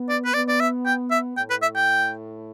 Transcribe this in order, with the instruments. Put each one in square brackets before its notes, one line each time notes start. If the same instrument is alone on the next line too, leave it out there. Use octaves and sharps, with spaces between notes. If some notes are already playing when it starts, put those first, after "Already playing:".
Already playing: [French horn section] B3
[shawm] D5
B4
[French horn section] B3 [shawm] D5
[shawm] D5
E5
G5
E5
[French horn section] A2 [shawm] G5
[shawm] B4
E5
G5